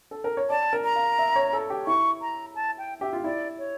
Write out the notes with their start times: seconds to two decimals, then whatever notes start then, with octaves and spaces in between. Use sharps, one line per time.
0.11 A4
0.24 A#4
0.37 C#5
0.50 D5 A5
0.73 A#4
0.84 A#5
0.96 F5
1.19 E5
1.36 C#5
1.53 A4
1.70 G4
1.87 E4 C#6
2.22 A#5
2.55 A5
2.78 G5
3.01 G4 E5
3.13 F4
3.24 E4 D5
3.58 C#5